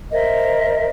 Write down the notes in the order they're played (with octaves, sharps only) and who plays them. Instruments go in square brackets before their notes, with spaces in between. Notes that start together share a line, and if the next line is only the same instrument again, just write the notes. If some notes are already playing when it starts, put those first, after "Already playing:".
[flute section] A#4 C5 D#5 E5